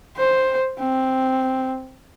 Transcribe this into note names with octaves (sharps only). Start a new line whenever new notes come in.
C5
C4